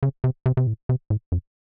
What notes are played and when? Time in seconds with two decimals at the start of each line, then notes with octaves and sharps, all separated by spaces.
0.03 C#3
0.24 C3
0.46 C3
0.57 C3
0.67 A2
0.89 C3
1.10 A2
1.32 F#2